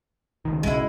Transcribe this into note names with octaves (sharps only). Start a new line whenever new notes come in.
C#2 D#3
B1 G#2 C#3 G#3 E4